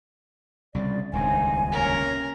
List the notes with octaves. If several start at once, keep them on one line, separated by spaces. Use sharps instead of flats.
C2 C#3 D5
D#1 C#2 G2 C#3 C4 D#4 G#5
C3 A#3 C#4 A#4